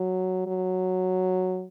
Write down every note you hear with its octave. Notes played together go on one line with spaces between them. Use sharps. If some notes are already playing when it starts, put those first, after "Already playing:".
Already playing: F#3
F#3